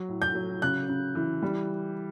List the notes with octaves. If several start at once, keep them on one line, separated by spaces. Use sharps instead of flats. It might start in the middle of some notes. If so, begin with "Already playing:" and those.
Already playing: F#3
A2
G6
F#3
C#3 F#6
C#3
E3
G3